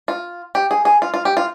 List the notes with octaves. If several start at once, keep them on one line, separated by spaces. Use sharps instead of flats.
F4
G4
G#4
G#4
F4
F4
G4
F4